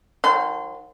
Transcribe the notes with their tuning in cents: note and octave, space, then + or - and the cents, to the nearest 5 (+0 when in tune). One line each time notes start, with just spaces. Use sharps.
D#3 +0 F#3 -45 C6 -30